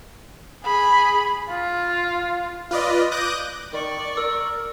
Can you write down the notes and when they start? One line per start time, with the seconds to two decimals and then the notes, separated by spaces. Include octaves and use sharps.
0.65 G#4 B5
1.50 F4
2.71 F4 B4 D5 D#5
3.12 D6 D#6 F#6 G6 A#6
3.73 D#3 D5 C#6
4.17 A#4 E6